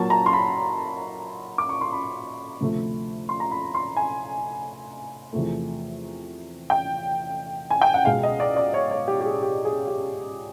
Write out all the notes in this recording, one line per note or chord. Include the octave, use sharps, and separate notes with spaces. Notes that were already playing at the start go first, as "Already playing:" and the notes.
Already playing: A#2 F#3 A#3 A5
A#5
C6
B5
D6
C#6
C6
B5
D2 C3 F3 A3
C6
A#5
B5
C6
G#5
E2 C3 F3 A3
G5
G#5
G5
F#5
C#2 B2 G#3 F5
D#5
D5
D5
C#5
C#5
G4
G4
G#4
G4
G#4
G4